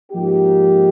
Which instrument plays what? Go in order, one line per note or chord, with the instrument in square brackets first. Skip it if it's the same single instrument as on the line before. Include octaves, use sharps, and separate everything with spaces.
[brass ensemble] G#2 F3 A#3 D#4 G4